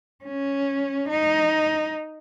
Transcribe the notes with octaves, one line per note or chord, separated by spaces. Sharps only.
C#4
D#4